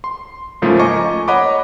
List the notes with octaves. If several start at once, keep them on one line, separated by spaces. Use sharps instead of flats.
C6
G#2 C#3 F3 A3 A#3 F4
D#5 G#5 A#5 C#6 D6
C#5 D#5 F#5 A#5 B5 D6